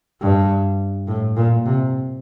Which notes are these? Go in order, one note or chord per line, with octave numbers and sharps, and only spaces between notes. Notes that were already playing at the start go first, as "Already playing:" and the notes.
G2
A2
A#2
C3